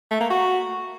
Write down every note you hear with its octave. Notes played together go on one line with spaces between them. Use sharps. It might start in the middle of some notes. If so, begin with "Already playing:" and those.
A3
A#3
F#4